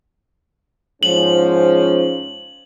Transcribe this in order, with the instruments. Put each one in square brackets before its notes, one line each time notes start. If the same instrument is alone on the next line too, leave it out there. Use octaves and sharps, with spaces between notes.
[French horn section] G#2 F3 C#4 [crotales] F#7